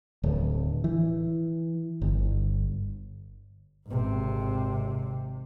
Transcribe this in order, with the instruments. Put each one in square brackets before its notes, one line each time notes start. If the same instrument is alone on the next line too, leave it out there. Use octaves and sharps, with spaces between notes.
[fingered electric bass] D1
E3
G1
[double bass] G#1 C3